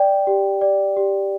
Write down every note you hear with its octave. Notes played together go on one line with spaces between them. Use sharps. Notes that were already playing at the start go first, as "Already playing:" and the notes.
Already playing: D5 G5
G4
D5
G4